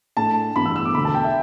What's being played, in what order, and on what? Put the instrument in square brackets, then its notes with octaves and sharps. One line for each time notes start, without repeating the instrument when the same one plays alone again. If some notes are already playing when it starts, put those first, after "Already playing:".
[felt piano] A2 A3 D4 [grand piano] A5
[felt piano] G2 E3 B3 [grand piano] B5
[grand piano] E6
E6
D6
[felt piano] E1 D2 D3 [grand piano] B5
[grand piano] A5
G5
E5